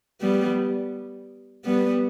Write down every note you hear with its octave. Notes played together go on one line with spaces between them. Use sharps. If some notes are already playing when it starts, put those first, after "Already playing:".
G3 B3
G3 B3